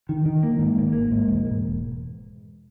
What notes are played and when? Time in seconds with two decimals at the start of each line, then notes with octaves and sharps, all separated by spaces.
0.09 D#3
0.26 D#3
0.43 A#3
0.59 G#2
0.77 G#1
0.93 A#3
1.11 G#2
1.28 E1
1.45 E1